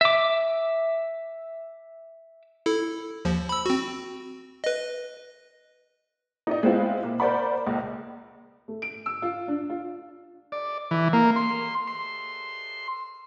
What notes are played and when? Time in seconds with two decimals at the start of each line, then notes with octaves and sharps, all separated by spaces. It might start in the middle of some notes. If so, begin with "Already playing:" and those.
0.01 E5 D6
2.66 E4 A4
3.25 D#2 F3
3.49 B5 E6
3.66 C4 F#4
4.64 B4 D#5
6.47 D#4 D5 D#5
6.63 G#3 B3 C4 E4 F4
7.03 A#2 A#3
7.20 A#4 C5 D5 F#5 B5
7.66 C#2 A#2
8.68 A3
8.82 D7
9.06 E6
9.22 F4
9.48 D4
9.70 F4
10.52 D5
10.91 E3
11.13 A#3
11.36 C6
11.87 C6